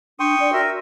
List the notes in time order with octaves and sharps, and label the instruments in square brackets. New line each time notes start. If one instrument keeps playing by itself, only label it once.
[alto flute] D4 [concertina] G5 C6 [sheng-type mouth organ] C#6 D#6
[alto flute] D5
[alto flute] F#4 [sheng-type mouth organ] A#4 E5